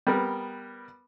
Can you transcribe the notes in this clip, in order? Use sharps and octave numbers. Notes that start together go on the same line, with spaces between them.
G3 B3 A#4